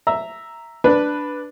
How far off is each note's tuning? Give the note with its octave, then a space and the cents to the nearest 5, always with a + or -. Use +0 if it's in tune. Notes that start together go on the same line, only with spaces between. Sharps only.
E5 +0 A#5 -5
D4 +0 B4 +0